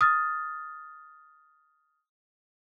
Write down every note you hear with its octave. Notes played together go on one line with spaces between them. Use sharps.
D#6 F6 A6